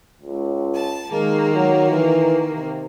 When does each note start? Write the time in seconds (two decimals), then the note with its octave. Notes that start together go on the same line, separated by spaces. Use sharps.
0.22 C#2
0.74 A5
1.11 D#3 G#3 A#3
1.54 F#3
1.91 E3
2.48 C3